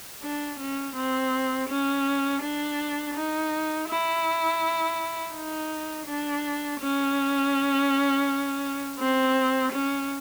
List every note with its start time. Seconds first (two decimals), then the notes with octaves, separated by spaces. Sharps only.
0.22 D4
0.60 C#4
0.96 C4
1.69 C#4
2.42 D4
3.15 D#4
3.89 E4
5.33 D#4
6.07 D4
6.81 C#4
8.99 C4
9.72 C#4